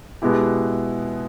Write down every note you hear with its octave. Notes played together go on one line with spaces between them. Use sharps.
B2 G#3 B3 E4 G4